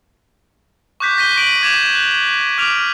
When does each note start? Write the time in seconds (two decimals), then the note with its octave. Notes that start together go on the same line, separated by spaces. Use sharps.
1.00 C#6 D6 F#6 G6 B6
1.17 G6 A#6 B6 D#7 G7
1.36 C#6 B6 D7 D#7 F#7
1.61 D6 G#6 E7 F7
1.95 F#6
2.58 D6 F6 D7 F7